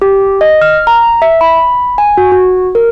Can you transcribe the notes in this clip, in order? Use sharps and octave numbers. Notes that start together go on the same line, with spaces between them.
G4
D#5
F6
A#5
E5
B5
G#5
F#4
F#4
A#4